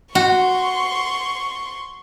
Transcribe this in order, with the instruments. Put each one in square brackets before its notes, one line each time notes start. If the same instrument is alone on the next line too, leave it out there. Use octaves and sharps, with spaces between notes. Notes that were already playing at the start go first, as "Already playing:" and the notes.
[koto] F#4 [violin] C6 C#6